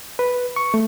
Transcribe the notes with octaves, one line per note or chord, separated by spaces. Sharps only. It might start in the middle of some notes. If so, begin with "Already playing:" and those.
B4
C#6
A3